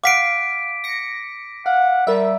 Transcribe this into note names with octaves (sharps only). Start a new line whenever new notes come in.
F5 F#5 D6 B6 C7 D7
A#6 C#7
F5 F#5
G3 A#4 E5